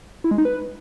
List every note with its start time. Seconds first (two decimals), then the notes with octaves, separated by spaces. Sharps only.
0.24 E4
0.31 G#3
0.38 D#4
0.45 B4